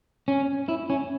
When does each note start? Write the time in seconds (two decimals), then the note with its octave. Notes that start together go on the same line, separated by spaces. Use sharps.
0.28 C#4
0.69 E4
0.90 C#4